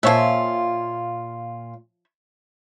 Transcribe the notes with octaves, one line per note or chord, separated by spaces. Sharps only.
A#2 F3 F4 C#5 E5